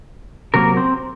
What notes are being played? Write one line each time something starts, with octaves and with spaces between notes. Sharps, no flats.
C3 F#3 A#3 A#4
C4